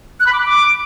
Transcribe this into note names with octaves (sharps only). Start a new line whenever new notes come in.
F#6
B5
D6
B5
D6